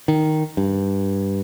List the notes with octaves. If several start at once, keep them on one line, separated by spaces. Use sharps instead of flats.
D#3
G2